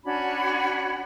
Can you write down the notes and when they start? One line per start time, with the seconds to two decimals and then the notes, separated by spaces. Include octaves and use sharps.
0.05 C#4 D4 F#4 B5